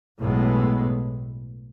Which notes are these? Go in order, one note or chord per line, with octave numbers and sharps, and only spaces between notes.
B1 A2 G#3 B3